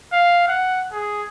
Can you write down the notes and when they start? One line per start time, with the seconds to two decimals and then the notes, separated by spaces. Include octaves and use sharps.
0.13 F5
0.48 F#5
0.92 G#4